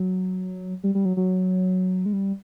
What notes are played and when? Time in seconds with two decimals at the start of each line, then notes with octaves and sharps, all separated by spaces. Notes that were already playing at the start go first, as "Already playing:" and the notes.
Already playing: F#3
0.84 G3
0.95 G3
1.05 F#3
1.17 F#3
2.06 G#3
2.13 G3